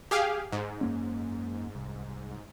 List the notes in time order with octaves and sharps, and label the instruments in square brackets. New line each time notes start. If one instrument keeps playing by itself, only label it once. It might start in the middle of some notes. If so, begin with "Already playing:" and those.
[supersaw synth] G4 G#4 F5
G#2
[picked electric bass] F#2 A#3 C#4
C2